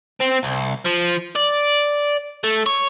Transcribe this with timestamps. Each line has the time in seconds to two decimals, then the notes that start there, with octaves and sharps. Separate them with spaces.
0.21 C4
0.44 C2
0.86 F3
1.35 D5
2.44 A3
2.66 C#5